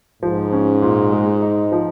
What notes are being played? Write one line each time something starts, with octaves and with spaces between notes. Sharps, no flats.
G#2 F3
C#4
A#2
G#3
D#4
F3